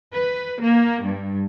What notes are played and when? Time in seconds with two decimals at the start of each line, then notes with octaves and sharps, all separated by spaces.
0.13 B4
0.58 A#3
1.03 G2